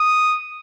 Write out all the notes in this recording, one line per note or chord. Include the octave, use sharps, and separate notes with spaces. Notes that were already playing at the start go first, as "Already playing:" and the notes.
Already playing: D#6